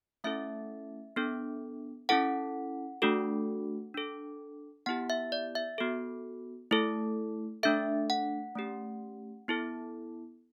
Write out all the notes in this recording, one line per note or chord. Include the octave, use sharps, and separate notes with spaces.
A3 C#4 E4 A4 E5
B3 D4 A4
C#4 E4 A4 F#5
A3 D4 F#4 A4
D4 A4
B3 E4 G4 F#5
E5
D5
E5
B3 F#4 A4
A3 E4 A4
A3 D4 A4 E5
F#5
A3 C#4 G4
B3 E4 A4